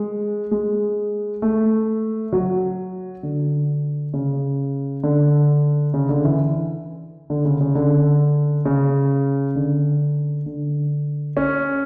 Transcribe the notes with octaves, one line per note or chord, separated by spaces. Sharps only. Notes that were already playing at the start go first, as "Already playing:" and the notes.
Already playing: G#3
G#3
A3
F#3
D3
C#3
D3
C#3
D3
E3
D3
C#3
C#3
D3
C#3
D3
D3
C#4